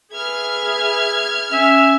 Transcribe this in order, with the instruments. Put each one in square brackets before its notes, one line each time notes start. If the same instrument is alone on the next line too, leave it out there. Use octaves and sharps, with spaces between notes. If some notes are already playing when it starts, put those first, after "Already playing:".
[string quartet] G#4 B4 E5 [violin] F6 G#6
[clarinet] C#4 [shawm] E5